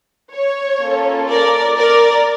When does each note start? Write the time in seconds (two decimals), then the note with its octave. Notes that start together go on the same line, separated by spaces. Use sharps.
0.33 C#5
0.81 A#3 C#4 F4 A4
1.28 A#4 D5
1.77 A#4 D5